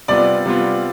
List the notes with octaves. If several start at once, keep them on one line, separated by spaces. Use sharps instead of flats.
C3 G3 B3 F4 D5
C3 G3 B3 F4